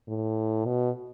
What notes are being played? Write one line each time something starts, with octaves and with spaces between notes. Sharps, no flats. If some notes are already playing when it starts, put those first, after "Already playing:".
A2
B2